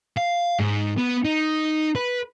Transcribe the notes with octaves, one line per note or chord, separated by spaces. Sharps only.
F5
G#2
B3
D#4
B4